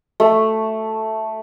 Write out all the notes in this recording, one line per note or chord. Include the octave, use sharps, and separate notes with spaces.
A3